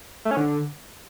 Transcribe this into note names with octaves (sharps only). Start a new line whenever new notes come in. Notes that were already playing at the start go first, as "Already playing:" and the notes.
A3
C#4
D3